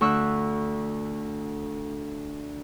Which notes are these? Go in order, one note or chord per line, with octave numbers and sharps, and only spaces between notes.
D2 C#6 E6 F#6